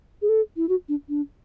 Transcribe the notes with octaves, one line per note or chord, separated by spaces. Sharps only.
G#4
A4
E4
F#4
D4
D4